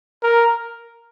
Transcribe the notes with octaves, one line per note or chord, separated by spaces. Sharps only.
A#4